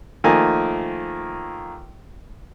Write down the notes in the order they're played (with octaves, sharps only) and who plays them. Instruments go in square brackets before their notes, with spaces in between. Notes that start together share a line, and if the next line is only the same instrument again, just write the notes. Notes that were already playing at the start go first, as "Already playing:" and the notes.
[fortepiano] D#3 F3 A3 A#3 D#5 G#5